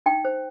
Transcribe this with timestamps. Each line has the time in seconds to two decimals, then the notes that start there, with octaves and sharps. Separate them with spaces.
0.06 D#4 G5
0.25 C5